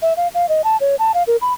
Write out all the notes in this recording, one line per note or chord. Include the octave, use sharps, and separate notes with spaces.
E5
F5
F5
D#5
A5
C#5
A5
F5
A#4
B5